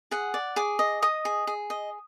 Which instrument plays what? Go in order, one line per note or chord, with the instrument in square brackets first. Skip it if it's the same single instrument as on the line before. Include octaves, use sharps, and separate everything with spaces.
[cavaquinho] G#4 F#5
D5
G#4 D6
D#5
D#5 D#6
G#4
G#4
D#5